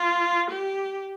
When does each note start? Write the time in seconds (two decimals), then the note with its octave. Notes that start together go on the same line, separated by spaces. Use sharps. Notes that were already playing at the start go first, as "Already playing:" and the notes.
Already playing: F4
0.51 G4